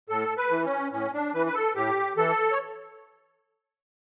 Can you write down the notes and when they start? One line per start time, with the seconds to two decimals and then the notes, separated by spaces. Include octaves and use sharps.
0.09 A2 A4
0.37 B4
0.50 E3
0.65 C#4
0.92 A2 C#4
1.13 D4
1.34 E3 B4
1.46 B4
1.54 A4
1.75 A2 G4
2.17 E3 A4
2.52 C#5